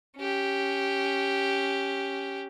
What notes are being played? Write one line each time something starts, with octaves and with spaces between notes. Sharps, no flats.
C#4 G4